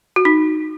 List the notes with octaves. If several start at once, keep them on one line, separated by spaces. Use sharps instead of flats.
F#4
D#4